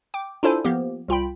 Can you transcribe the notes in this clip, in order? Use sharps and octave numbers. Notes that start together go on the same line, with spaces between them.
G5 D6
D4 E4 F4 A4 C5 G#5
F3 A#3 B3 G4
C2 F4 G5 B5